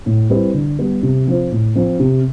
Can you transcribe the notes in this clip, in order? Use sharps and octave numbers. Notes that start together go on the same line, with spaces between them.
A2
G3 C4 E4 B4
D3
G3 B3
C3
F3 C4 F4 C5
A2
F3 C4
C3